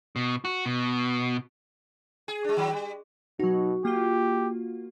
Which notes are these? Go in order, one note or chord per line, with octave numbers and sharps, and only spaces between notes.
B2
F#4
B2
G#4
G#3 D4
D#3 F#3
G3
B2 F#3 D#4 F#4
A#3 F4 G4